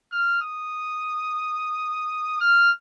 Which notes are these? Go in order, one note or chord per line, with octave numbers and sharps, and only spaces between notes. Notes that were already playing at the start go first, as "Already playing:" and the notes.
F6
D#6
F6